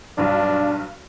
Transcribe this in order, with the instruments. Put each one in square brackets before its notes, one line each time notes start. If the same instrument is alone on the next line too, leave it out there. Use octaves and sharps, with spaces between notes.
[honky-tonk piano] B1 G2 [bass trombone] D4